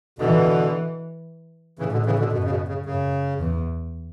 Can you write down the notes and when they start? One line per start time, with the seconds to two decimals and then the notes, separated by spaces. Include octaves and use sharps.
0.19 B2 D3 E3
1.79 A2 C#3 E3
1.92 B2 D3
2.06 C#3 E3
2.19 B2 D3
2.32 F#2 B2
2.44 C#3
2.50 B2
2.68 C#3
2.86 F#2 C#3
3.39 E2